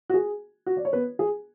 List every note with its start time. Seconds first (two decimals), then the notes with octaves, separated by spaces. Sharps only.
0.10 F#4
0.14 G#4
0.66 F#4
0.77 D5
0.85 C#5
0.93 B3 B4
1.19 G#4